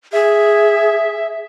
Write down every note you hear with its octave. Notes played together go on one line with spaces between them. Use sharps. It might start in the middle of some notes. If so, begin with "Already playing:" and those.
G#4 E5